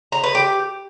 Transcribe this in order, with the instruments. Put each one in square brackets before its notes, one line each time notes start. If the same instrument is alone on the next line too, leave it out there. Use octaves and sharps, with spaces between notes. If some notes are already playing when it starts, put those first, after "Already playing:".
[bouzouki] A#5
B4
G4